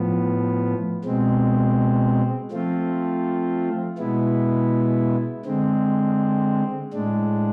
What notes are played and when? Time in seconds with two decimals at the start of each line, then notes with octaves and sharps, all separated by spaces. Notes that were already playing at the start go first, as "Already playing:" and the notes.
Already playing: A2 F3 B3
1.04 B2 G#3 C4
2.51 F3 A3 C4 F4
3.98 B2 G#3 B3 E4
5.45 D3 G#3 C4
6.93 A2 G#3 D4